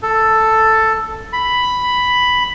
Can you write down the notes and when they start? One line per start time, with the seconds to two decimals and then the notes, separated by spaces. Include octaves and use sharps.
0.03 A4
1.33 B5